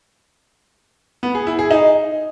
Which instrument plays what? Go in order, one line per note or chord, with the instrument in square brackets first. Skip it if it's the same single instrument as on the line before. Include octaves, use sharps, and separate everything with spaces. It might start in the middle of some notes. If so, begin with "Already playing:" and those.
[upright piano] B3
G#4
E4
G#4
D#4